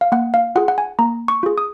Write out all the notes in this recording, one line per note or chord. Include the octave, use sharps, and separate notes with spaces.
F5
A#3 F#5
F5
F4 G#4 F#5
F#5
G#5
A#3 A#5
C#6
F4 G#4
D#6